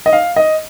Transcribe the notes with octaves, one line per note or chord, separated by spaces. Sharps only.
D#5
F5
D#5